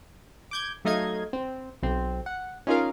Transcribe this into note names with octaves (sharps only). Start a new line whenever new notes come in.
D6 G6 G#6
F#3 A3 D#4 D#5 F5 G#6
C4
B1 C4
F#5
C#4 D#4 F4 G#4 A#4 F5